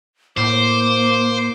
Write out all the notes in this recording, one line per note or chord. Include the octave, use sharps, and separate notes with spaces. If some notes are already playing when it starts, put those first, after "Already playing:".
A2 A#3 C5 D6